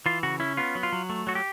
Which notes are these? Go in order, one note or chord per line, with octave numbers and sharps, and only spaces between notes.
E3 F4
C#3 F#4
C#4 E4
B3 F4
F#3
F4
F#3
A3
F#3 F#4
G4